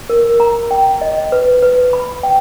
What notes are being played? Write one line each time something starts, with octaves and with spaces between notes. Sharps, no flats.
A#4
A#5
G5
D#5
B4
B4
B5
G5